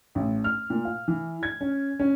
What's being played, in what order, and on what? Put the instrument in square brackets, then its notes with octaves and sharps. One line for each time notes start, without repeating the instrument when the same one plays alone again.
[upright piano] A1
F6
A#2
F5
E3
G#6
C#4
C#4